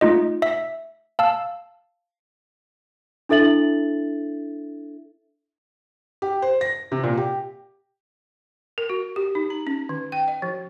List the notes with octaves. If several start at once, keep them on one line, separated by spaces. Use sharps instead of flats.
A3 D#4 F4 D#5
E5 B6
F5 A5 E6
D4 E4 A4 E5 A6 F#7
G4
C5
A#6
C3
A#2
G4
A#4
F#4
G4
D#4
A#5
C#4
D#3
G5
D#5
F3